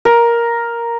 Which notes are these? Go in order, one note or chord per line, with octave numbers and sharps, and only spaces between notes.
A#4